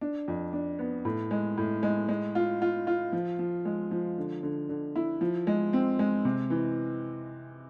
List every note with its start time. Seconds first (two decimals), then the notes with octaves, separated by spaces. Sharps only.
0.01 D4
0.28 F2
0.53 D4
0.79 B3
1.05 A2
1.31 G#3
1.57 A2
1.83 G#3
2.09 G#3
2.35 F4
2.62 F4
2.87 F4
3.12 F3
3.39 F3
3.65 G#3
3.91 F3
4.18 D3
4.43 D3
4.69 D3
4.96 E4
5.21 F3
5.47 G#3
5.73 C4
5.99 G#3
6.25 C3
6.50 E3